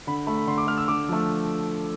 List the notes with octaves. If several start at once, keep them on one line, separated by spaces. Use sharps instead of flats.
D3 B5
A3 B5
B5
D3 C6
D6
A3 F6
E6
D3 D6
F3 A3